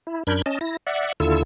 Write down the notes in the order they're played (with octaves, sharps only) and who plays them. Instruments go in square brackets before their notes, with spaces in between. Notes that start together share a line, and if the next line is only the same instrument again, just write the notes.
[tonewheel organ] E4
F#2 D4 A#4 B5 G6 G#6
C#4 D#5 A5
E4 A#6
D5 E5 F#5
D#2 D3 E4 F4 A4 E6